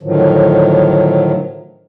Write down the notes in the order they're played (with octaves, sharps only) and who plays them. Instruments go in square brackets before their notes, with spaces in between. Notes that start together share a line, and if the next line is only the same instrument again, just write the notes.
[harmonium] A2 D3 D#3 F3 F#3